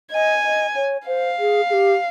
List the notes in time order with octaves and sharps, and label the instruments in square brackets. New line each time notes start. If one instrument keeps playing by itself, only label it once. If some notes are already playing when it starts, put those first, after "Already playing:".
[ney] D#5 [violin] G#5
[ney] D#5
C#5
[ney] C5 [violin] F5
[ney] G#4
G#4
G4